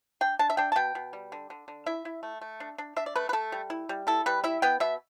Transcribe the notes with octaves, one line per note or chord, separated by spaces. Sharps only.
D4 G5
D4 A5
E5
D4 G5
A5
B2 G5
B2
G3
D3
D3
D3
E4 E5
E4
A3
A3
D4
D4
D4 E5
D5
A3 B4
B4
A3 A4
G3
E4
G3
E4 A4
G3 B4
E4 E5
B3 G5
B2 E5